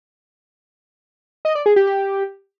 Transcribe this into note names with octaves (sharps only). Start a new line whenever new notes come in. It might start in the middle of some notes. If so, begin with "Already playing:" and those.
D#5
D5
G#4
G4
G4